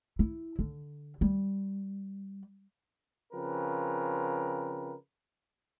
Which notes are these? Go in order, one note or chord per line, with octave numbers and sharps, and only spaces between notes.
E4
D3
G3
C#3 F3 C4 A#4 B4